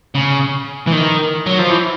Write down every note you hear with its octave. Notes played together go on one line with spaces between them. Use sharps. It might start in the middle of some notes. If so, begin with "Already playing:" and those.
C#3
E3
D#3
F#3
F3
E3